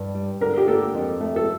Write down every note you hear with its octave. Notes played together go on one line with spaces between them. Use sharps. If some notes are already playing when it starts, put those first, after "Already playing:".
Already playing: G2
G3
D3 A#4
G4
A#3 A4
F2
A3
A4